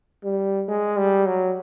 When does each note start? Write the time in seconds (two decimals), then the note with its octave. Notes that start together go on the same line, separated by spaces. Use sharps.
0.24 G3
0.68 G#3
0.97 G3
1.26 F#3